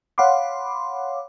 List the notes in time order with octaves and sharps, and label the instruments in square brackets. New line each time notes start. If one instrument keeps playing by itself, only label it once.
[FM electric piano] C#5 F5 F#5 B5 C6 D6